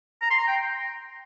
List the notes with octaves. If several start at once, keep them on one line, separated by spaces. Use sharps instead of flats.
A#5
C6
A#5
G5